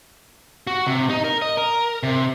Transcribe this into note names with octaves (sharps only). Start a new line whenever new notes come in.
F#4
C3
D#4
A#4
D#5
A#4
C3